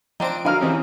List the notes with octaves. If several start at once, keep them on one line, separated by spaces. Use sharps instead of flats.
F3 C4 D4 D#4 D7
D3 F#3 D#4 G#4 A#4 F5
E3 C4 C#4 G4 D#5 G#5